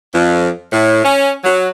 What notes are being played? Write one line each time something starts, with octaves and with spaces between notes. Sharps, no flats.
F2
A2
C#4
F#3